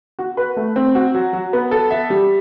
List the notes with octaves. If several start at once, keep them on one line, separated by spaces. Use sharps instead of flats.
F#4
B4
A3
C4
F#4
F#3
F#3
B3
A4
E5
G3